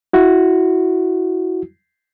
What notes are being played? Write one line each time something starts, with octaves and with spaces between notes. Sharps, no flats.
E4 F#4